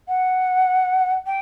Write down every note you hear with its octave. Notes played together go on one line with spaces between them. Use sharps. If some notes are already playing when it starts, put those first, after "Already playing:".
F#5
G5